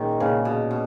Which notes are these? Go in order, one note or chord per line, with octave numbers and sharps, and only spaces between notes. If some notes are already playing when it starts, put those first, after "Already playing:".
Already playing: A#2 D#3 G#3 C#4
A#2 C#3 G#3 C#4
B2
B2